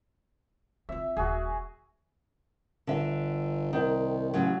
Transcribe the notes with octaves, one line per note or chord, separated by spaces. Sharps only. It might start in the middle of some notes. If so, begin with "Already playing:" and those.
C4 F4 E5
D#1 F#4 G#4
G1 D3 E5
C2 D#3
A1 C#3 F#3